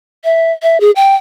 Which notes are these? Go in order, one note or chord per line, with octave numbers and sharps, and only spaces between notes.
E5
E5
G#4
G5